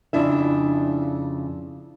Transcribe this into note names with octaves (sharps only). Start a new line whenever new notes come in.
F2 C#3 D4 E4 E5